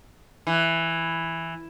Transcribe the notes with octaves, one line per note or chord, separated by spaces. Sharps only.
E3